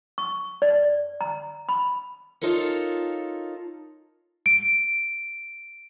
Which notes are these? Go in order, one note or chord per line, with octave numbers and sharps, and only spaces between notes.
C#6
D5
A#5
B5
D#4 F4 A4 A#4 C#5
D7